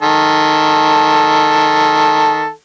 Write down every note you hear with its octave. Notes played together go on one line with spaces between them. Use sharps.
D#3 A4